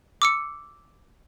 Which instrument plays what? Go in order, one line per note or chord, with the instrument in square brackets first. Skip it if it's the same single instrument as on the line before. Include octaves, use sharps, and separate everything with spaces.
[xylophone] D6 E6 C#7